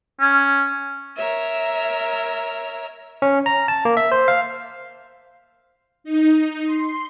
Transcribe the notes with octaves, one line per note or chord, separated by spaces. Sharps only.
C#4
A#4 C#5 E5
C#4
A#5
A5
A#3
E5
C5
F5
D#4
C6